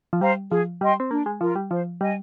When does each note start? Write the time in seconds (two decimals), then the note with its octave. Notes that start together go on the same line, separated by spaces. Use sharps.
0.13 F3
0.21 G3 C5 F5 A#5
0.51 F3 G#4
0.80 G3 D#5 G5 C6
1.00 C4
1.11 A#3 D4
1.26 G#3
1.41 F3 F4 A#4
1.56 G3
1.71 F3 C5
2.01 G3 D#5 G#5